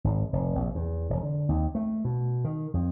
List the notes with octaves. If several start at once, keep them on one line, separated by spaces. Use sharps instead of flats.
G#1
F1
A#1
E2
E1
D3
D#2
A3
B2
D#3
F2